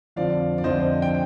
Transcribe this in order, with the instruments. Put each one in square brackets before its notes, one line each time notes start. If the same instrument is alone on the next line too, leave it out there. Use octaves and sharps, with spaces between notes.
[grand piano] F2 D3 F3 D5 F5
D5
F2 D3 F3 C5 D#5
C5
G5